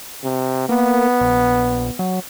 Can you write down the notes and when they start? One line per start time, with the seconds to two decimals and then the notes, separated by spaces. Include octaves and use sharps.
0.24 C3
0.69 A#3 B3
1.20 A#1
1.99 F#3